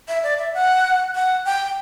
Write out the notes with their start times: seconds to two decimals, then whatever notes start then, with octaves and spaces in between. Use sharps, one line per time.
0.08 E5
0.23 D5
0.38 E5
0.54 F#5
1.15 F#5
1.45 G5